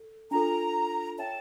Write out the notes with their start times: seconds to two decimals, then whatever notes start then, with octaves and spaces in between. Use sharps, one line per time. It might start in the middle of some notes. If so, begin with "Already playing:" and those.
Already playing: A4
0.31 D4 F4 A4 A#5
1.18 C#5 E5 G5 A5